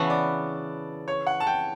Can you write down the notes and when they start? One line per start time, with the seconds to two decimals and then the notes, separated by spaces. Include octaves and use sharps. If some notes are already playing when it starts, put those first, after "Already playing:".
Already playing: C#3 E3 B3 F#4 A5
0.10 D5
1.08 C#5
1.27 F#5
1.40 A5
1.47 G5